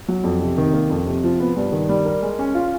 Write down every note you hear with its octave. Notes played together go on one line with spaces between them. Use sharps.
F#3
F2
C3
D#3
A#3
F2
C3
F3
B3
G2
D#3
G3
A#4
G#3
C#4
F4